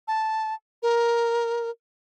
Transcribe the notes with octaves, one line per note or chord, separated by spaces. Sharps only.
A5
A#4